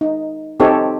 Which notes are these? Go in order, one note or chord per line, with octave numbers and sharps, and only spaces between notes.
D#4
C4 D#4 G4 A4 C#5